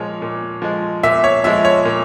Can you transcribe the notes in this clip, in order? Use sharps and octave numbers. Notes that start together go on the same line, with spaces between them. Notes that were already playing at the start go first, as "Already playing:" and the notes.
Already playing: A#2 F3 G#3 C#5
A#2
F3 G#3
A#2 E5
C#5
F3 G#3 E5
C#5
A#2